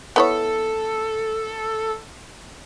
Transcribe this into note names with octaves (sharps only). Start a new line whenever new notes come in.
B3 E4 A4 C#5